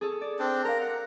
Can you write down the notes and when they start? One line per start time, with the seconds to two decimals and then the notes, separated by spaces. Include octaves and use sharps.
0.01 G#4 A4 C#5
0.21 D5
0.39 C4 D4
0.65 A#4 F5 A#5
0.80 F#5